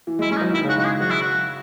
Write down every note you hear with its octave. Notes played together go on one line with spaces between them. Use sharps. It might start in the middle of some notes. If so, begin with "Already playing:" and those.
E3
G#3
E4
G#3 C#4
D#4
F#3
D#3 E4
C#3 F#4
G#3 F#4
G#4
F#3 F#4
E4
F#4